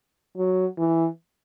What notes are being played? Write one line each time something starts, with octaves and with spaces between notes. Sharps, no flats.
F#3
E3